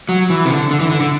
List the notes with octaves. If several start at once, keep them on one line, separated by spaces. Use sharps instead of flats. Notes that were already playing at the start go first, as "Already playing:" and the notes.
F#3
E3
C3
D3
D3
E3
D3
D3